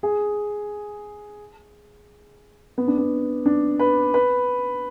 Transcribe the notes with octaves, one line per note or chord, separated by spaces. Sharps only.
G#4
B3
D4
B3
D4
B4
B4